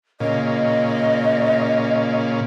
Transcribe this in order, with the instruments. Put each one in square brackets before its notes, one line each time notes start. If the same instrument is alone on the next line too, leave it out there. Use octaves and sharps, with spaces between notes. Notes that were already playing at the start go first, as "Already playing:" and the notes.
[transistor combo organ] A#2 C#3 [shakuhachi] D#5